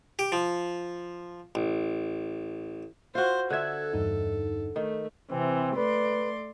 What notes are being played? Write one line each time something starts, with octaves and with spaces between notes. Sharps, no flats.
G4
F3
A1
F4 F#4 C5
D3 A4 E5 F#6 G#6
E2 G2 D#4
D#3 A3
C3 E3 C4
A3 B4 D5 C6